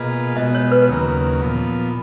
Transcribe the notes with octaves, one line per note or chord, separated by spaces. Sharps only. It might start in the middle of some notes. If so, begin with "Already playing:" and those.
Already playing: B2 A#3 F4 G#4 B4 D#5
B2 G#3 B3 F#4 D#5
C#5
B4
D#2 C#3 F#3 A#3
A#2 F3 B3